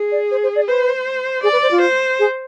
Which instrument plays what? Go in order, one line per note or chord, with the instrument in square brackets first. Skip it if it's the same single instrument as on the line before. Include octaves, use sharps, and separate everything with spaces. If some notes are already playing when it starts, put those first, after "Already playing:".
Already playing: [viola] G#4
[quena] D5
C5
C5
D5
[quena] B4 [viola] C5
[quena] G#4 [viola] D5
[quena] B4
C5
F4
[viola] C5
[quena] G#4